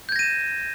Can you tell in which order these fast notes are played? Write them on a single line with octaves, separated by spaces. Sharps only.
G6 G#6 A#6 D#7 E7